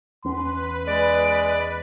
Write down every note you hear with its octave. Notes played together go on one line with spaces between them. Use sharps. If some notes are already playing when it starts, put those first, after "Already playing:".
E2 C#4 B4 C6
G#3 D5